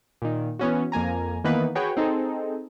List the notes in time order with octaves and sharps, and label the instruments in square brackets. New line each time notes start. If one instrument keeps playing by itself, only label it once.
[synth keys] A#2 D#3
E3 B3 C#4 F#4
F2 A#3 G#5 A#5
D#3 E3 A#3 B3 D#4 B4
F#4 G#4 B4 C#5 G5
C4 D#4 G#4 A4